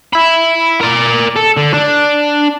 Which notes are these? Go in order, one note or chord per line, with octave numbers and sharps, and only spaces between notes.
E5 B5
A#4 D5
A4
D3
D4